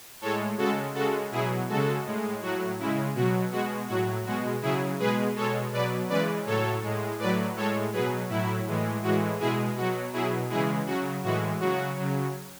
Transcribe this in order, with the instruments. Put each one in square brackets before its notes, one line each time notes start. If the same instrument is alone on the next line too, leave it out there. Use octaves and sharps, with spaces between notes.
[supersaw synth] A2 G#3 A4 C#5
C#3 G#3 F#4 A4
C#3 G#3 F#4 A4
B2 F#3 E4 G#4
C#3 G#3 F#4 A4
A2 G#3
A2 F#3 F#4
C#3 G#3 E4
B2 F#3 F#4
B2 G#3 F#4
A2 F#3 F#4
B2 G#3 F#4
C#3 F#3 E4 G#4
B2 G#3 G#4 B4
B2 G#3 A4 C#5
B2 F#3 B4 D5
C#3 E3 G#3 B4 D5
A2 F#3 A4 C#5
A2 G#3
A2 F#3 B4 D5
A2 G#3 A4 C#5
B2 F#3 G#4 B4
A2 F#3 E4
A2 E3 G#3
A2 E3 G#3 F#4
B2 G#3 E4 G#4
B2 F#3 F#4
B2 F#3 E4 G#4
C#3 E3 G#3 E4 G#4
C#3 F#3 F#4
A2 E3 G#3 F#4
C#3 F#3 F#4
C#3 F#3